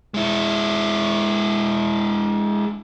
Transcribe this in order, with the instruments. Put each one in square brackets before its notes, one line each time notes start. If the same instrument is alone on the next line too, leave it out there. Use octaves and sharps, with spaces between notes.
[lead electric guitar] G#3 E4